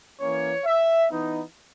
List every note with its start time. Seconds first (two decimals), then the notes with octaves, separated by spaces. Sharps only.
0.21 E3 A#3 C#4 C#5
0.66 E5
1.11 E3 B3 D#4